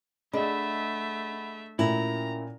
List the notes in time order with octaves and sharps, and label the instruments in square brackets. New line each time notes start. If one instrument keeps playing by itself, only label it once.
[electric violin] A3 E5 [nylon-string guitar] D4 [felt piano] G#4 D#5 [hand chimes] F#5 B5
[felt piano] A#2 A3 [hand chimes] C#4 A#4 [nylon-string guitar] E4 [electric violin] A#5